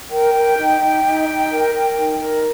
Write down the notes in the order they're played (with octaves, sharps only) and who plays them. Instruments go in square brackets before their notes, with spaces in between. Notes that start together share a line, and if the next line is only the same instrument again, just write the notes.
[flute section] A#4 G5
A#4
D#4
D#4
D#4
D#4
A#4
A#4
D#4
A#4